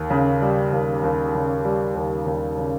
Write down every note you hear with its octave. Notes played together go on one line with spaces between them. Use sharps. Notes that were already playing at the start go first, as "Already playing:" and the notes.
Already playing: D#2
C#3
G3
D#2
D#2
C#3
G3
D#2
D#2
C#3